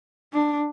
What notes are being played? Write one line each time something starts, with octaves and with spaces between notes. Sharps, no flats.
D4